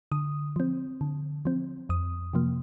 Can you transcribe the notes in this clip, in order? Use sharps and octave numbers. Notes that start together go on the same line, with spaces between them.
D3 D#6
F3 C4
D3
F3 C4
F2 D#6
C3 F3 A#3